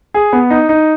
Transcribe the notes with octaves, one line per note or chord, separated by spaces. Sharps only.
G#4
B3
D#4
D#4